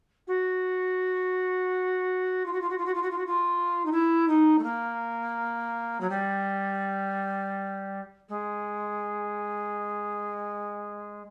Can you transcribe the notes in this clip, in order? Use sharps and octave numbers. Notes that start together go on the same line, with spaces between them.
F#4
F4
F#4
F4
F#4
F4
F#4
F4
F#4
F4
F#4
F4
D#4
E4
D#4
A3
A#3
F#3
G3
G#3